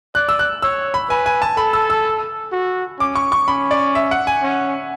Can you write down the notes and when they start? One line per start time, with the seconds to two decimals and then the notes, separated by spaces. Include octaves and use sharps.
0.15 D5 F#6
0.29 E6
0.39 F#6
0.62 C#5 E6
0.94 B5
1.10 B4 G#5
1.26 G#5
1.42 A5
1.57 A4 B5
1.73 E6
1.90 E6
2.52 F#4
2.99 C#4 D6
3.16 C#6
3.32 C#6
3.48 C#4 B5
3.71 D5
3.95 E5
4.11 F#5
4.27 G#5
4.43 C#4